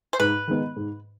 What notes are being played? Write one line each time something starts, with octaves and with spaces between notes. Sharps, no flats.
C5
G#2 B4
D#3 G#3 B3 D#4
G#2